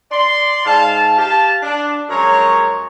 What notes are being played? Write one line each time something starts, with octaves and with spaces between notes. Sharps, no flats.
D5 C6
G#2 F5 A5
G4 F5 A5
D4
F#2 F3 G#3 C#5 A#5